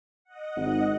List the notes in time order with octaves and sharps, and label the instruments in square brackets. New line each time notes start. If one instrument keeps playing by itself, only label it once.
[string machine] D#5 F#5
[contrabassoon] G#1